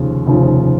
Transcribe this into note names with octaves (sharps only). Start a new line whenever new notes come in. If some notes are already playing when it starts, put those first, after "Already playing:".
Already playing: F1 D#2 C#3 F3
F1 D#2 C#3 F3